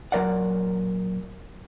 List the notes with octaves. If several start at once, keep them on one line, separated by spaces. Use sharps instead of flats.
A#2 F#3 A#4 D5 F#5